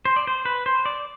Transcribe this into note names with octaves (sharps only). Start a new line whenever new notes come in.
C5
D5
C5
B4
C5
D5